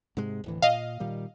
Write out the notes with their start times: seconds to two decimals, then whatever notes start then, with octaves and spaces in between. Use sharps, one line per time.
0.17 G#2 C3 G#3
0.44 D1 A2 E3
0.62 A#2 D#5 F5
1.00 A#2 D#3 G3